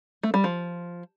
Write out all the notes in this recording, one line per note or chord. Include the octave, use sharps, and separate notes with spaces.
A3
G3
F3